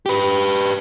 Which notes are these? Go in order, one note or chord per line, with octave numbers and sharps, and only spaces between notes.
G4 B4